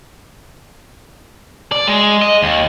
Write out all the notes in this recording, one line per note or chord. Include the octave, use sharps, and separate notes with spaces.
D5
G#3
D#5
D#2